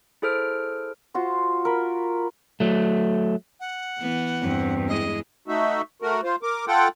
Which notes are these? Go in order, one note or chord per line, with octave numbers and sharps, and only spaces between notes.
E4 G#4 A4 C5 F6 D7
F4 F#4 C5
A#4 B5
F#3 A3
F#5
E3 B3
E2 G2 C4
G#3 E4 G#4 D#5
A3 D#4 F#4 E5
A3 F#4 A#4
F4 C5
A#4 D6
F4 A4 F#5 G5